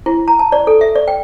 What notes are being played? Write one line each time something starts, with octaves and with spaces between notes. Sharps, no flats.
E4
A#5
A5
D5
A4
E5
D5
G5